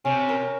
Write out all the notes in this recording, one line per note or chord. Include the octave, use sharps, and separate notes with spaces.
C3 C#4
A#4